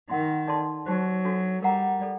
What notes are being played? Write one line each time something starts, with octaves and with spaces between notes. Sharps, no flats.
D#3 A#4 F#5 C6
D#4 A4 D5 A5 C6
F#3 D#4 G4 C5
D4 F#4 A4
G3 A#4 F#5 A#5
A4 D5